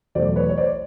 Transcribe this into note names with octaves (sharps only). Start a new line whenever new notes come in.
E2 B2 F#3 A3 C5 D5
B4 C#5
C#5
C5 D5